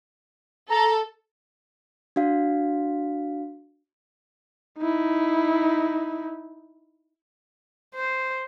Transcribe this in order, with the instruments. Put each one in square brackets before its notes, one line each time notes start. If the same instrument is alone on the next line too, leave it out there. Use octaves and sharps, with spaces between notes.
[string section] A4 [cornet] A#5
[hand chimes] D4 F#4 F5
[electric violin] D#4 E4
[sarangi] C5